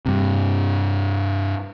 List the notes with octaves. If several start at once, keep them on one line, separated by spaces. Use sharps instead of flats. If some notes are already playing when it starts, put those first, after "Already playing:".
G2 C3